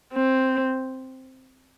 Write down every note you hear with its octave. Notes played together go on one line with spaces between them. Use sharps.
C4